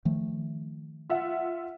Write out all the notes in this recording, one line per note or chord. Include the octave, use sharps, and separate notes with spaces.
D#3 F3 A3
F4 E5 F#5